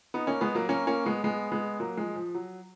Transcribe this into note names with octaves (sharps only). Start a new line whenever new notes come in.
B3 D#4
A#3 C#4
G#3 B3
F#3 A#3
A#3 C#4
A#3 C#4
G#3 B3
G#3 B3
G#3 B3
F#3 A#3
F3 G#3
F3
F#3